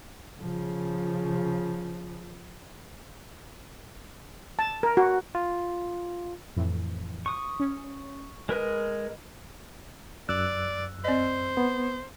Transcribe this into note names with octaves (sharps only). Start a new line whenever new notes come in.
C#3 F3
A5
A#4
F#4
F4
F2 A2 E3
C#6 D#6
C#4
G#3 A#4 B4 D#5
F#2 D5 E6 F#6
C4 C5 D5 D#5
B3